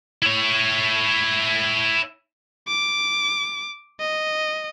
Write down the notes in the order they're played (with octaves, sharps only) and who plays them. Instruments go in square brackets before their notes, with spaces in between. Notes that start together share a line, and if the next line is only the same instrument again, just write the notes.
[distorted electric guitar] E4 C#5
[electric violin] D6
D#5